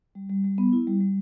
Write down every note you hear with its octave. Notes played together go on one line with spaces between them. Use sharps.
G3
G3
G3
B3
E4
G3
G3